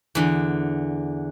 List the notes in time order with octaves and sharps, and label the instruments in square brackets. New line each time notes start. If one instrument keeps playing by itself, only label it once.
[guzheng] E2 D3